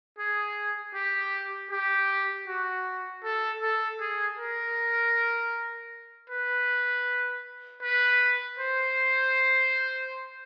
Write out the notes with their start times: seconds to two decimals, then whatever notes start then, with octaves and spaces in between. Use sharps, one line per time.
0.18 G#4
0.94 G4
1.71 G4
2.48 F#4
3.23 A4
3.62 A4
4.01 G#4
4.39 A#4
6.30 B4
7.82 B4
8.59 C5